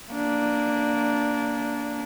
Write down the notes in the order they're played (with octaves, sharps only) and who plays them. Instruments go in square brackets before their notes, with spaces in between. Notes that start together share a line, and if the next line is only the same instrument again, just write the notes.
[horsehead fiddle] A#3 D4